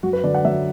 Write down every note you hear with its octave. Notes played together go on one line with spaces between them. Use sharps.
F#2 F#4
B4
D3 D5
F#5
F#3 E5